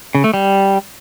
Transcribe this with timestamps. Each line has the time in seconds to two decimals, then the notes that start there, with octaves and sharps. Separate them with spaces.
0.15 C#3
0.24 A3
0.34 G3